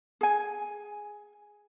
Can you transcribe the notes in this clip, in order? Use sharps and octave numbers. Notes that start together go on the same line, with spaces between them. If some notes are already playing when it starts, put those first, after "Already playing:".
G#4 G#5